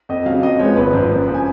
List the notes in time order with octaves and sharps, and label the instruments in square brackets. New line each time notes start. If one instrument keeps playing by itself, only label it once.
[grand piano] F2 D#5
C#3 F#3 F5
F2 D#5
F3 G#3 B3 C#5
G#1 B4
F#2 F3
F#2
C#3 F3 B3
G#5